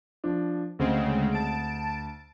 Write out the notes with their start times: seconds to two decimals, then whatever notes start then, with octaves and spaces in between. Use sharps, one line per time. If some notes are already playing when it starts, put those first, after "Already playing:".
0.24 F3 D4
0.79 D2 C#3 G#3 C4
1.32 A5 D7